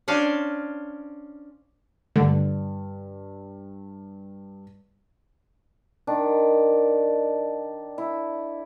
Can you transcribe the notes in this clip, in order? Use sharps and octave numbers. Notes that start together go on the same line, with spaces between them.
C#4 D4 C5 F5
G2 D3
D#3 D4
E4